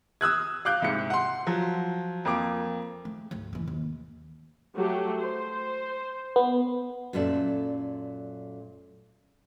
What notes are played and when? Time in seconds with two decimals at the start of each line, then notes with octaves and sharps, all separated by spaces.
0.21 D#6 E6 F#6 G#6
0.65 F5 D6 F#6 G6
0.82 C2 G#2 C#7
1.10 F#5 C6
1.47 F3 F#3
2.25 F2 A#3 D6
3.05 A3
3.31 D2 G#2
3.53 D#2 E3
3.68 D#2
4.76 F#3 A3 G4
5.21 C5
6.36 B3
7.13 F#2 A#2 A3 A4 D5